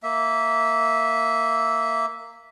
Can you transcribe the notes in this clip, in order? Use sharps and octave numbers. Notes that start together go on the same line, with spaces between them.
A#3 E5